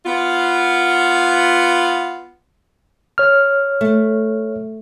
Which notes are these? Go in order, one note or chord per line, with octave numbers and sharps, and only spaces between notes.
B3 F4
C#5 F6
A3